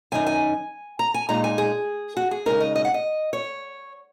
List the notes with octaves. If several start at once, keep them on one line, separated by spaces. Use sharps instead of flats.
F#2 D#3 F#3 D#4 G#5
G#5
A#5
G#5
A#2 G#3 D#4 A#5
G#5
G#4
F#4
G#4
C#3 G#3 D#4 A#4
D#5
D#5
F#5
D#5
C#5